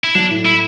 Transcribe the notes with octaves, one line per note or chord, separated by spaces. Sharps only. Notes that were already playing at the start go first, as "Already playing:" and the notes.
E4
F#3 D4
A2
E4